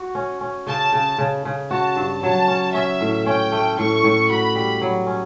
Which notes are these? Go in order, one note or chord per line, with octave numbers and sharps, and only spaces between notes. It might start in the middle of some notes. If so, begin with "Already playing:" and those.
Already playing: F#4
C#4
C#4
C#3 A5
C#3
C#3
C#3
F#4 A5
G2
F#3 A5
C#4
C#4 E5
A2
C#4 G5
A3
A2 C#6
A2
F#4 B5
G3
F#3
C#4